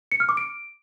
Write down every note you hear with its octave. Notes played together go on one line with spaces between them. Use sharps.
C#7
F6
D6
D7